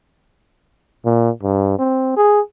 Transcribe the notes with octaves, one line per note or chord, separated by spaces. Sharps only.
A#2
G2
C4
G#4